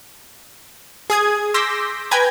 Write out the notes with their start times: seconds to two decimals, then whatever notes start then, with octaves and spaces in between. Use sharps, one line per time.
1.10 G#4 D#6 G#6
1.54 C6 D6 E6 G6 A#6 B6
2.11 B4 G5 G#5 A#5 G#6